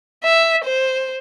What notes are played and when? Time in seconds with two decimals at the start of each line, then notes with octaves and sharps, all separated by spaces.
0.24 E5
0.65 C5